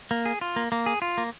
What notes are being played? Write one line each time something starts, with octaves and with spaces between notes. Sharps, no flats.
A#3
G#4
F4
A#3
A#3
G#4
F4
A#3